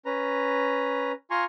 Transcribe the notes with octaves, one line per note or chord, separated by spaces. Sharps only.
C#4 B4 A#5
F4 G#5 A#5 C6 C#6